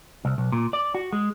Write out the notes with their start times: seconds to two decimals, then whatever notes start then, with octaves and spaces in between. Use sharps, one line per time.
0.25 C2
0.38 B1
0.52 A#2
0.73 D5
0.95 F#4
1.13 G#3